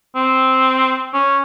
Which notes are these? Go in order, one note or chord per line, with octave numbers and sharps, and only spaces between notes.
C4
C#4